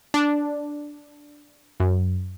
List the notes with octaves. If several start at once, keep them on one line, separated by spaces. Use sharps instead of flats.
D4
F#2